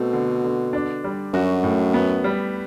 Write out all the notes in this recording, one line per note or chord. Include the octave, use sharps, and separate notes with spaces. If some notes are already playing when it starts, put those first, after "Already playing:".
Already playing: B2 A3 C4
D3
D3
D4
G3
F#2 F#4
A2
B3
G3